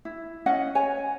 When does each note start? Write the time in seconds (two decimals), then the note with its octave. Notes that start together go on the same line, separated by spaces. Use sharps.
0.05 E4
0.46 C#4 D#5 F#5
0.75 C#5 G#5